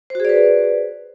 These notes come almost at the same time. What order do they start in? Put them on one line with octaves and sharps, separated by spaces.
C5 F#4 G#4 D5 B4